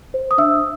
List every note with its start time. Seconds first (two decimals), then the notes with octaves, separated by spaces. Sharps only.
0.14 C5
0.31 D#6
0.38 D4 E5 E6